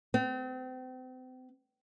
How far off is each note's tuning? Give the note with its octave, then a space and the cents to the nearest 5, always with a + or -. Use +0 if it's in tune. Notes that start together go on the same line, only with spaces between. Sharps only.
C4 -35